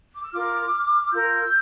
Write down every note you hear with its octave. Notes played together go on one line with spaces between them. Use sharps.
D6
E6
F4 A#4 D6 F6
F4 A#4 E6 G6